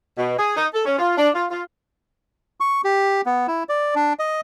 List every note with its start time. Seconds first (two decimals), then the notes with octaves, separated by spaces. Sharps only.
0.18 B2
0.38 G#4
0.56 D#4
0.74 A4
0.85 C#4
0.99 F4
1.17 D4
1.35 F4
1.51 F4
2.60 C#6
2.84 G4
3.26 B3
3.48 E4
3.69 D5
3.95 D4
4.19 D#5